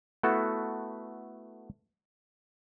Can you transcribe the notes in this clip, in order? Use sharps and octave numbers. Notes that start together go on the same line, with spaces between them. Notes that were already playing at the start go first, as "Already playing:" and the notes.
A3 B3 E4 F#4 A4